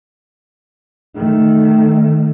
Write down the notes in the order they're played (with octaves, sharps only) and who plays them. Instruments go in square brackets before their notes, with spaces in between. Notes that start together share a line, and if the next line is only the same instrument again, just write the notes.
[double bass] D#3 A3